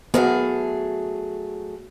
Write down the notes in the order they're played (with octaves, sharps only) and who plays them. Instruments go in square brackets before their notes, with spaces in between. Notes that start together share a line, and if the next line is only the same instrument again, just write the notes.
[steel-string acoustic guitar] F#3 A3 G#4 [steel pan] B3 A#4